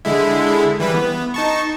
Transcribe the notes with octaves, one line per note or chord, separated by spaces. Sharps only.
D3 G#3 E4
E3 G3 B4
B3
D#4 A5 C#6